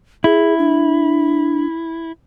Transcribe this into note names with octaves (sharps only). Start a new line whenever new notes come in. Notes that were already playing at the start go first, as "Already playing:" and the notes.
E4 G#4
D4